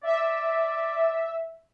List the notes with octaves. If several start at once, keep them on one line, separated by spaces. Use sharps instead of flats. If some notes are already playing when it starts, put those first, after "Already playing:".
D5 E5